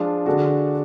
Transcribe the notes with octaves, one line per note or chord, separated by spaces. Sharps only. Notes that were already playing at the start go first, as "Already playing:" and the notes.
Already playing: F3 G#3 D4 F4
D3 G#3 D4 F#4